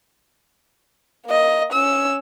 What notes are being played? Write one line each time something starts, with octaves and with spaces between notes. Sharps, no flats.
A#3 D#5
C#4 E6